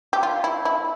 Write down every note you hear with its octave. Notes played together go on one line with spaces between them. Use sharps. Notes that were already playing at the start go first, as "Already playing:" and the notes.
G4
F4
E4
E4